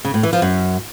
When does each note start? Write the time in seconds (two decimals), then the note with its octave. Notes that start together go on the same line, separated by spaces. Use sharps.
0.05 C#3
0.14 A2
0.23 E3
0.33 F3
0.42 F#2